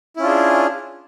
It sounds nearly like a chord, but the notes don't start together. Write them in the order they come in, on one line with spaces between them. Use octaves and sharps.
E4 C#4 F4 D4 G#4